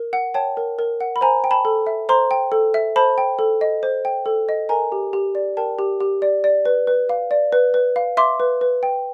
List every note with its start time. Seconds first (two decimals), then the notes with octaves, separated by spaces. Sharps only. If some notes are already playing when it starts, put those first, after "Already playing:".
Already playing: A#4
0.13 F#5
0.34 C#5 G5 A5
0.57 A#4
0.79 A#4
1.01 F#5
1.16 B5
1.21 C5 G#5 A#5
1.44 G5
1.51 A5 B5
1.65 A4
1.87 E5
2.09 C5 A#5 C6
2.31 G5
2.52 A4
2.74 E5
2.96 C5 A5 B5
3.18 G5
3.39 A4
3.61 D#5
3.83 C5
4.05 G5
4.26 A4
4.49 D#5
4.69 A#4 G#5 A#5
4.92 G4
5.13 G4
5.35 D5
5.57 A#4 G5 A5
5.79 G4
6.00 G4
6.22 D5
6.44 D5
6.65 B4
6.87 B4
7.09 F5
7.31 D5
7.52 B4
7.74 B4
7.96 F5
8.17 E5 C6 D6
8.40 B4
8.61 B4
8.83 G5